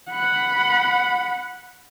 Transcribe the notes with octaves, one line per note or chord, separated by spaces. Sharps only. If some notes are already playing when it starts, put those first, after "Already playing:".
F#5 B5